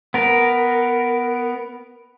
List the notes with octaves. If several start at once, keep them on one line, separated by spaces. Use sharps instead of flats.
B3 A#4